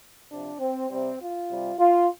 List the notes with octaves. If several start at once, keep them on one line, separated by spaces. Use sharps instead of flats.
C3 F3 D4
C4
C3 G3 C4
F4
C3 G3
F4